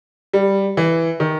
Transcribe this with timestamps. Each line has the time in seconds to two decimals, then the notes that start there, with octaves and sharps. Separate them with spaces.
0.33 G3
0.77 E3
1.20 D#3